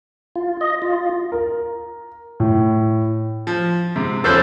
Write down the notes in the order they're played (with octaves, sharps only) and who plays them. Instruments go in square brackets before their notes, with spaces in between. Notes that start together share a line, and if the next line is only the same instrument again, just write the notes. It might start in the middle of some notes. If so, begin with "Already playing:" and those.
[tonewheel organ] F4
D#5
F4
[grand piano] A#4
A2
F3
G#2 C3
[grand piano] E2 F3 C#4 [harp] A4 B4 C5